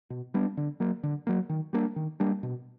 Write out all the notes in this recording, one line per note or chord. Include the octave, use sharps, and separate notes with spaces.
B2
G3 B3 D4
D3
F#3 A#3
D3
F#3 A#3
D#3
G3 A#3 D4
D#3
G3 A#3 D4
B2